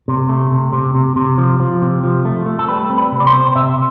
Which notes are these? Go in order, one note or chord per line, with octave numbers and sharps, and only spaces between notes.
C3
A3
C3
C3
C3
C3
F3
F3
C3
F3
A3
A3
A4
G3 B4
C4
B4
C3
D5
C5
C4
C3 E5